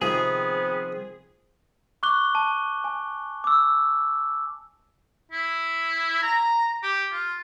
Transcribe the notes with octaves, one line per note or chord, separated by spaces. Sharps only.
C3 D#3 F3 B3 C4 G#4
C#6 D6 F#6 G7
A5
G#5
D6 E6
E4
A#5
G4
F4